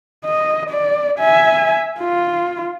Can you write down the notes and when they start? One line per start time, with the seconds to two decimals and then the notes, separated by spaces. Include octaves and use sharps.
0.25 D#5
0.70 D5
1.19 E5 G#5
1.99 F4